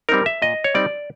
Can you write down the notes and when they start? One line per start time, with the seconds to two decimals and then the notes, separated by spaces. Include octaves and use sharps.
0.09 G3 C4 D#4 A#4
0.26 E5
0.42 A#2 D#5
0.64 C#5
0.75 G3 C4 D#4 D5